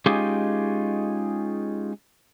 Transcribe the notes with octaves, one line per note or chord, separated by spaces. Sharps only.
G#3 C#4 D#4 F4 G4 G#4